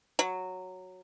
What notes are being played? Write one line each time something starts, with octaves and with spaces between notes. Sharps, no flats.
F#3